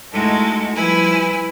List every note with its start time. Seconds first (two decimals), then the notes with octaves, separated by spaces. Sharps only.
0.13 G#3 A3 D#4 E4 F#4 A4
0.76 F3 G3 E4 B4 G#5